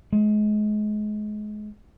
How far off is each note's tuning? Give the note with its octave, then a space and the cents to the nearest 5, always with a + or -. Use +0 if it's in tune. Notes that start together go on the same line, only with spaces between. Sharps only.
G#3 +30